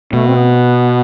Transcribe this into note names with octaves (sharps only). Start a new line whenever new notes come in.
B2 A3
C4
B3